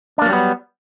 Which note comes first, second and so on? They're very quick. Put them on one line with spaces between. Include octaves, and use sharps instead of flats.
D4 A#3 F#3 G3 B3